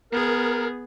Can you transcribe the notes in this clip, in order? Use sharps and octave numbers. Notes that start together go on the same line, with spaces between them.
B3 G#4 A#4